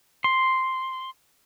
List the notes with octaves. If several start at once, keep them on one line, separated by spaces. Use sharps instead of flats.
C6